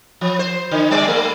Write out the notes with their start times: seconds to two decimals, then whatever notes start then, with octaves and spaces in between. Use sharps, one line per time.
0.21 F3
0.39 C5
0.71 D3
0.91 G3 C4 D5
1.08 A3